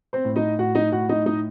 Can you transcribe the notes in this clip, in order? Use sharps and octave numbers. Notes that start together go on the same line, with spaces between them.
C4 C5
A2
D#4 D#5
A2 F#4 F#5
D#4 D#5
A2 F#4 F#5
D#4 D#5
A2 D#4 D#5